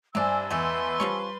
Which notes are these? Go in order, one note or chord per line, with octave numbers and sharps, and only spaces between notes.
G2 C3 D4 C5 D5 G#5 E6
E2 G#3 A3 B4 C6
F3 G3 C#4 C#6